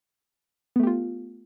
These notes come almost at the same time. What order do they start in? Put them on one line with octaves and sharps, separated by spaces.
B3 A3 G4 F4